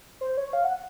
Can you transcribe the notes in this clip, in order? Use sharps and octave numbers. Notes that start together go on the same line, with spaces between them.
C5
C#5
F5
F#5